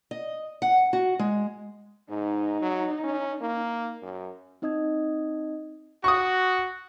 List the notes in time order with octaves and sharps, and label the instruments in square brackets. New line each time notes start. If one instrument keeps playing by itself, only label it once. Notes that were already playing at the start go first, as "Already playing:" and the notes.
[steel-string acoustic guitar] D#5
F#5
F#4
G#3
[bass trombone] G#2 [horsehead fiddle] D#4
[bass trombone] F#3
C#4
A#3
F#2
[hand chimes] C4 D#4 D#5 D#6 G#6
[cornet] F#4 [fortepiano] C#6 D#6